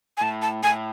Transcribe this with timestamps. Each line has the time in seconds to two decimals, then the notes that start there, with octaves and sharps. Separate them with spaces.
0.17 G#5
0.21 A2 A5
0.42 A5
0.63 A2 G#5